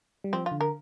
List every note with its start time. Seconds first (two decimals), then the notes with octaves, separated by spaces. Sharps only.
0.24 G3
0.33 F3 C4
0.46 F4
0.51 D3
0.61 A#4